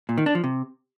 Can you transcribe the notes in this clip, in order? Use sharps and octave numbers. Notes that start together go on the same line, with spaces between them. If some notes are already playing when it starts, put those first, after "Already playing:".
A#2
D#3
D4
F3
C3